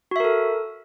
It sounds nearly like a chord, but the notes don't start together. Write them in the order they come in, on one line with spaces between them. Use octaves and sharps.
F#4 E5 A#4 A4